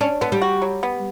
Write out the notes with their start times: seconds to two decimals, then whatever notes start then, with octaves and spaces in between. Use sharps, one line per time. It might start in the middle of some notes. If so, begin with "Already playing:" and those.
0.01 C#4 D4
0.21 D3 B3
0.32 G3
0.42 F#4
0.62 F#3
0.83 B3